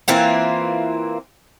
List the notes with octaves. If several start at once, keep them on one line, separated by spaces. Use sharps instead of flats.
E3 A#3 C4 F4